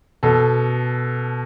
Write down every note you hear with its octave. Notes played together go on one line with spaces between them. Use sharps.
B2 A4